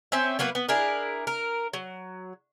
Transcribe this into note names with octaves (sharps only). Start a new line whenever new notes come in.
C4 C#4 E5
F#3 A#3 B3 B4
B3
D4 E4 G#4 A#4
A#4
F#3